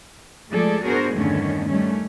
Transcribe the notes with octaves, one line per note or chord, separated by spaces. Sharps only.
F3 G#3 A3 G#4 A4 D5
B3 D4 F#4 G#4 A#4 C5
E2 G2 D3 D#3 A3 C#4
D#3 G3 A3 C#4